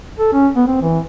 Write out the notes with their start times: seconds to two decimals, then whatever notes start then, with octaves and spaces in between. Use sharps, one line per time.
0.18 A4
0.33 C#4
0.56 B3
0.67 C4
0.82 E3